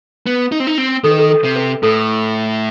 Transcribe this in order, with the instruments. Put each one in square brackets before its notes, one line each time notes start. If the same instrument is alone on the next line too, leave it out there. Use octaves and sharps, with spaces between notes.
[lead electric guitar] B3
D#4
C4
D#4
C4
[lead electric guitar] D#3 [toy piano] A4
[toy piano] B4
A4
A4
[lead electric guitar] C3
[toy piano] B4
[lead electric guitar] A2 [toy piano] A4